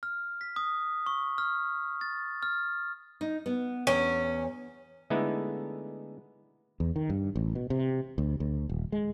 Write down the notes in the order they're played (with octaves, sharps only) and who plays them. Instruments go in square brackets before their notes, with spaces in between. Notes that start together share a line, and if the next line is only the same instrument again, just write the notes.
[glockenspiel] F6
B6
D#6
C#6
F6
A6
F6
[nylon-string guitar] D#4
B3
[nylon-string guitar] E2 [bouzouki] C#4
[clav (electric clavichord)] D3 G#3 A3 B3 D#4 E4
[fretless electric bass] E2
D#3
G2
A1
B2
C3
D2
D2
D#1
G#3